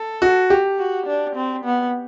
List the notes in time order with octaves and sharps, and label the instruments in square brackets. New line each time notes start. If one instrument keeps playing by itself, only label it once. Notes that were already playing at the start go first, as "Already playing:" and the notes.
Already playing: [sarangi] A4
[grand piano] F#4
G4
[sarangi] F#4
D4
C4
B3